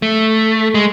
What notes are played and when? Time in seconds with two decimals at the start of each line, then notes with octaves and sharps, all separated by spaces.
0.02 A3
0.74 G#3